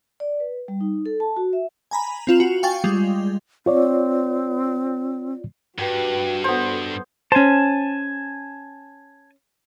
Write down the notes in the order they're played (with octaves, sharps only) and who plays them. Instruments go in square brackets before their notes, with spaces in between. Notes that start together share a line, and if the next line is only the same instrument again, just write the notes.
[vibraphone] D5
B4
G3
D#4
A4
A5
F#4
E5
[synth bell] G#5 A#5 B5
C4 F4 E7 F#7
F#4
F5 G5 G#5 C#6 A6
G3 G#3 F4
[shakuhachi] C4 [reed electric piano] F4 C#5 D5
[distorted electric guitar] G2 [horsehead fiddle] F#4 [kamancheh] G4 B4
[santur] B3 C5 [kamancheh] A4
[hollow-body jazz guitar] C#4 C5 [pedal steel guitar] G#5 A5